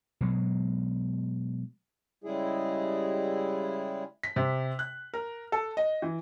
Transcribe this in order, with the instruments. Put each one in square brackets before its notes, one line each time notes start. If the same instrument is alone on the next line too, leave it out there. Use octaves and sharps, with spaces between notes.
[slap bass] B2 F#3 G#3
[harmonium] C#3 G3 G#3 E4 G#4
[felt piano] B6
C3
F#6
A#4
A4
D#5
E3